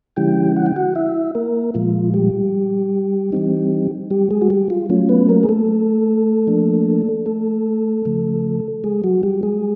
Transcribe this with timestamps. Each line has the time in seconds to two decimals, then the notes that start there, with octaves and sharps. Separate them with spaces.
0.16 D3 F3 G#3 C#4 E4 G4 G5
0.56 F#5
0.66 G5
0.76 F#4 F#5
0.95 E4 E5
1.35 A#3 A#4
1.74 A#2 F3 G#3 F4
2.14 G3 G4
3.32 E3 G3 C4 D#4
4.11 G3 G4
4.31 G#3 G#4
4.42 F#4
4.50 G3 G4
4.70 F4
4.90 F#3 A3 C#4 F4
5.09 B3 B4
5.29 A#3 A#4
5.43 G#4
5.49 A3 A4
6.47 F3 A#3 D4
7.26 A3 A4
8.05 C#3 F3 A3
8.84 G#3 G#4
9.04 F#3 F#4
9.23 G3 G4
9.43 G#3 G#4